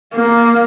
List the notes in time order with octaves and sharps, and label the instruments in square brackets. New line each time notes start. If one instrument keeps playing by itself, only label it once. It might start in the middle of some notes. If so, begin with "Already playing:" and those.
[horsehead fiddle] A#3